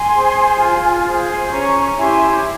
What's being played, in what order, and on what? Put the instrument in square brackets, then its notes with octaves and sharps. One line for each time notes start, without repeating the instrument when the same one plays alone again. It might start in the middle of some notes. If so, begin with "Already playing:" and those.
Already playing: [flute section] G#5 C6
G#4 C5
F4
G#4 C5
C#4 A#5 C#6
E4 G4 G#5 C6